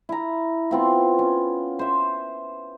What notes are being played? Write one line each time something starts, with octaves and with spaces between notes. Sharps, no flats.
E4 A#5
B3 C4 F4
C#4
C5 E5